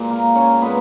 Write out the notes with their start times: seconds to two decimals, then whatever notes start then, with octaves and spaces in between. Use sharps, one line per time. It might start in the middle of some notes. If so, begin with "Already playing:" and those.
Already playing: A#2 G#3
0.10 A#3 A#4
0.35 C#4 C#5
0.61 A#2 G#3 B3 B4